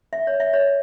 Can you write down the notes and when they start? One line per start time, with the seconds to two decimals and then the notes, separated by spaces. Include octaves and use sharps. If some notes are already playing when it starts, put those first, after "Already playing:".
0.13 E5
0.27 C#5
0.40 E5
0.53 C#5